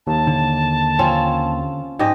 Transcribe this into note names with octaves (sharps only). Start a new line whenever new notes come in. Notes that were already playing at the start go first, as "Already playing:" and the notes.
D#2 A5
D3
C4 C#4 F4
G#2 G4 D#5